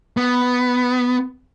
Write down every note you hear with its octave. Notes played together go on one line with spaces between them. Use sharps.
B3